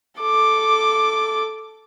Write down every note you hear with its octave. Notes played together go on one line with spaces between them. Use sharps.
A4 D6